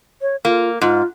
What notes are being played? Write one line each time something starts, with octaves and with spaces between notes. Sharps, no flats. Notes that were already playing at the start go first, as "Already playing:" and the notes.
C#5
A#3 F4
G#2 F4